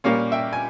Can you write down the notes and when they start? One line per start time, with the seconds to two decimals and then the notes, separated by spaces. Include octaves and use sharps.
0.04 A#2 G3 A#3 C#4 C#5 F5
0.32 E5 G5
0.53 G#5